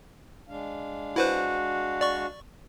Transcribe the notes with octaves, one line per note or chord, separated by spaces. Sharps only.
G#3 D4 F5
E4 F#4 B4 C5
D5 C#6